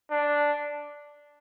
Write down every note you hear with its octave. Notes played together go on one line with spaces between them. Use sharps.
D4